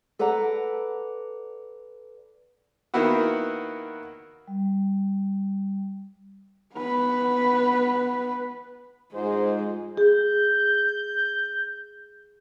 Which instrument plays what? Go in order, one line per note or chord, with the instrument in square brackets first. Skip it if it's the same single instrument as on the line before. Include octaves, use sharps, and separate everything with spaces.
[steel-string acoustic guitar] A4 B4 D5 F#5 A#5
[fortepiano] D#3 A#3 B3 E4 F#4
[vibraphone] G3
[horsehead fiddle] B3 B4
[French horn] G#2 [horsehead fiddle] G#3 [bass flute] F4 [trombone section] C5
[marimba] G#4 [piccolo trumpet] G6